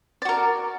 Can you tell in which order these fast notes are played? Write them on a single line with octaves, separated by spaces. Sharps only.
D5 F#4 A#4